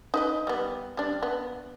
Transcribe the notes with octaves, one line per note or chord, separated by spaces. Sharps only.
D#4 B4 D#5
G3 B3
G3 D4
B3